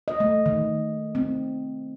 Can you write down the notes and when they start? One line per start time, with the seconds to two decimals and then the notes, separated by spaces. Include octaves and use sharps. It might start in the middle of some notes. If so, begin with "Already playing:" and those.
0.08 D#5
0.20 A3
0.46 D#3
1.15 C4